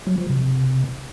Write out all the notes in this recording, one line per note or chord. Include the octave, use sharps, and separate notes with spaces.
F#3
F3
C3